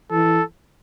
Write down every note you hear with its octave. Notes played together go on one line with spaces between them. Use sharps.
E3 A4